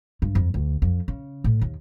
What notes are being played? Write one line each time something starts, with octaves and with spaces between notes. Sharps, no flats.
G2
F2
D2
F2
C#3
A2
D#2